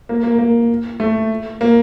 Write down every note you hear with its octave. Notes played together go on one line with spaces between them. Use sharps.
A#3
A#3
A#3
A3
A#3